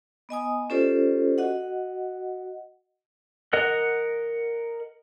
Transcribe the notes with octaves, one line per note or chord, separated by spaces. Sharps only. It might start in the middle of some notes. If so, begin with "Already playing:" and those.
B3 D#5 G#5 D#6
C#4 F4 G4 A4 C5 D5
F#4 D#5 F#5
A#4 D#5 F#5 F#6